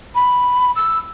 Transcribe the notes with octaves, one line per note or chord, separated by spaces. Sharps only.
B5
E6